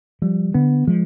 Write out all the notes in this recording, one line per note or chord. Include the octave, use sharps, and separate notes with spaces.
F3 G3
D3 B3
F3 G#3